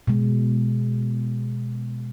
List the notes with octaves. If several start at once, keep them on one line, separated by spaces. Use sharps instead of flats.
B2 G#3